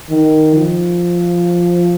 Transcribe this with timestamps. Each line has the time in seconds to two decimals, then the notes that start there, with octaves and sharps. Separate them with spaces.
0.10 D#3
0.55 F3